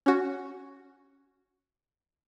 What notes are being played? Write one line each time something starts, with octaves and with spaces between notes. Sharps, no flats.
C#4 F#4